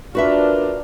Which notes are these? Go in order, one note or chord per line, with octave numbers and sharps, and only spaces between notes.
D4 F4 F#4 A#4 B4 E5